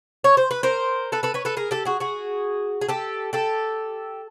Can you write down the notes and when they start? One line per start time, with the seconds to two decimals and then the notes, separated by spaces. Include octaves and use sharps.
0.24 C#5
0.37 C5
0.51 B4
0.63 A#4 C5
1.12 A4 B4
1.23 A4 B4
1.34 B4 C#5
1.45 A4 B4
1.57 G#4 A#4
1.71 G4 A4
1.85 F#4 G#4
2.00 F#4 G#4
2.81 G#4
2.88 G4 A4
3.33 G4 A4